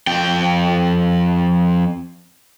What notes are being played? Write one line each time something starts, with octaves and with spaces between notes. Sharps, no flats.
F2 G5